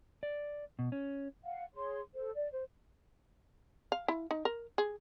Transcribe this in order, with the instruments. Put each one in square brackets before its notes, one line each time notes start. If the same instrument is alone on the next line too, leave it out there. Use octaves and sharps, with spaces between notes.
[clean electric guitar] D5
B2
C#4
[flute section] F5 F#5
G#4 C#5 C6
A4 C5
D5
C5
[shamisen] F5
E4
D#4
A#4
G#4